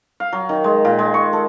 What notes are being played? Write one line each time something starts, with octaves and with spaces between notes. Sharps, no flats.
F5
F#3
D#3
G#3
A#2
G#3
C#6
A4